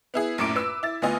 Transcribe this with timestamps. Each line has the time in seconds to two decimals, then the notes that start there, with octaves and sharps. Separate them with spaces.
0.14 B3 E4 G#4
0.38 A#1 F#2 A2 D6 D7
0.56 B4 E6
0.83 E4 A6
1.02 D2 B3 F4 D#5 G#5